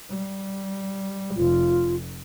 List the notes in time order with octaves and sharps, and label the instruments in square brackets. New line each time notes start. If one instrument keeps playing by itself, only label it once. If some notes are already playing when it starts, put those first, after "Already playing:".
[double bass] G3
[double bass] F1 [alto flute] F4